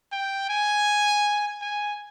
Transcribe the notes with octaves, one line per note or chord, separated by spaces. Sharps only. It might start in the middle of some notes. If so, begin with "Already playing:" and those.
G5
G#5
G#5